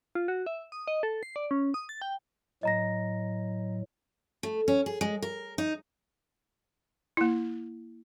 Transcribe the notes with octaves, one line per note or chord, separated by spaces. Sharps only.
F4
F#4
E5
D#6
D#5
A4
C7
D5
C#4
D#6
A6
G5
A2 F#3 D#5 A#5 A#6
A3
C#4
G#4
G#3
A#4
D#4
A#3 E4